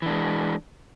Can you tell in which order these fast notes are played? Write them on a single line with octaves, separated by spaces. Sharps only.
E3 D4 G#3